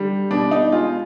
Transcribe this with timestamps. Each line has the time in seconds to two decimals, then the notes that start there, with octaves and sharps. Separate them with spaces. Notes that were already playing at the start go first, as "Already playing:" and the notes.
Already playing: D3 G3
0.31 B2 D4
0.51 D#4
0.72 G#3 F4